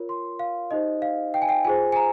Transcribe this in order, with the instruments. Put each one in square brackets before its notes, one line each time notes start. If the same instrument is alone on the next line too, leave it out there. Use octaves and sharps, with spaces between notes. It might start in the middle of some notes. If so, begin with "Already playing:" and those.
Already playing: [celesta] F4 A#4 C#5
C6
F5
D#4 G4 C5 D#5
F5
G5
G#5
G5
F4 G#4 C5 G#5
G#5
A#5